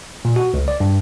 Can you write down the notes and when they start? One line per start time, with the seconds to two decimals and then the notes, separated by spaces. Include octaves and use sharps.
0.25 A#2
0.36 F#4
0.54 C#2
0.68 D5
0.80 G2